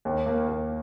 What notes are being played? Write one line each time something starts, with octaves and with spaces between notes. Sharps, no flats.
D#2
A#3
D#2